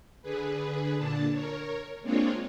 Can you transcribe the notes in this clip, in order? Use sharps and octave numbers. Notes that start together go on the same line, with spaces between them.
D3 G#4 B4
A#2 D3 D4 A5
A#4 C#5
G#3 A#3 C4 D4 F4 C#5